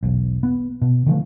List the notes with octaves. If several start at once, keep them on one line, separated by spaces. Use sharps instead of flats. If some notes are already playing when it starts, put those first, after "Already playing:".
E1 B1
B3
B2
D3 E3 F3 A3